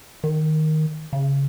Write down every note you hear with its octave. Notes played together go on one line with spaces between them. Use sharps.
D#3
C#3